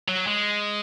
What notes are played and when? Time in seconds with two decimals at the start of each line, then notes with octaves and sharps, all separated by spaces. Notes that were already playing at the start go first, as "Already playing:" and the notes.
0.08 F#3
0.27 G#3